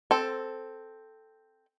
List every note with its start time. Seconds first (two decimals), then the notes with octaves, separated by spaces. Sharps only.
0.11 C4 A4